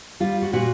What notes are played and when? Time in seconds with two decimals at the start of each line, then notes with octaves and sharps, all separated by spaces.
0.20 G3 F4
0.42 F#4
0.53 A#2 F#4